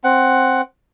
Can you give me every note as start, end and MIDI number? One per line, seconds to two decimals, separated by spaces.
0.04 0.61 60
0.04 0.61 78